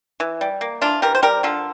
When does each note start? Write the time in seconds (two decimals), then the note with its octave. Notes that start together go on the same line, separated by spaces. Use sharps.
0.20 E3
0.41 G3
0.61 A#3
0.81 E3 D4 F4
1.02 E3 G4 A#4
1.15 C5
1.22 G3 G4 A#4
1.43 D3 F4 A4